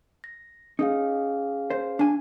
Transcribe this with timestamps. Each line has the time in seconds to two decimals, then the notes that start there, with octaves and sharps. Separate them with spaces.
0.24 A#6
0.79 C#4 D#4 G#4 F5
1.70 C5
1.99 D4 G#5